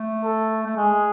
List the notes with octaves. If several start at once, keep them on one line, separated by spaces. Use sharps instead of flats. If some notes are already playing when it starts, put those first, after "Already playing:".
Already playing: A3
A4
A3
G#3 G#4